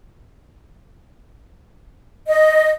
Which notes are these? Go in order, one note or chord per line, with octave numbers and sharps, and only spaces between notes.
D#5